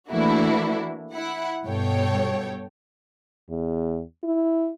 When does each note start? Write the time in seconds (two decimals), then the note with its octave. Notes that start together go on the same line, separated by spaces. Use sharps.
0.10 E3 A3 A#3 D4 E4 F#4
1.14 E4 F#5
1.66 G2 B2 A4 C#5 G5
3.50 E2
4.24 E4